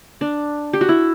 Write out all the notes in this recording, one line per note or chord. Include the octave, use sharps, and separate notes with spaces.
D4
G4
F#4
E4